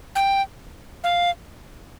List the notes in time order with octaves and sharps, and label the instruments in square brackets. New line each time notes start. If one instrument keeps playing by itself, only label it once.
[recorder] G5
F5